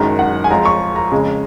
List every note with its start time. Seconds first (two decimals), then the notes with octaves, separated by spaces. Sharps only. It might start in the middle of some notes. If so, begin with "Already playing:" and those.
Already playing: F#1 F#2 D#3 G#3 A#5
0.19 F#5
0.44 G#5
0.50 F2 F3 G#3 A#5
0.65 C#6
0.96 A#5
1.12 F2 C#3 G#3